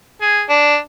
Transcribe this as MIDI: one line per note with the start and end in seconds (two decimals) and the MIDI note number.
0.21 0.43 68
0.49 0.77 62